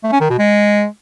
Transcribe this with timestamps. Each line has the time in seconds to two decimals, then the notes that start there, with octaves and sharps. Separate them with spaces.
0.04 A3
0.12 C#4
0.21 D#3
0.30 B2
0.38 G#3